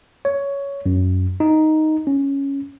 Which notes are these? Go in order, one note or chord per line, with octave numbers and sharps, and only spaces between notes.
C#5
F#2
D#4
C#4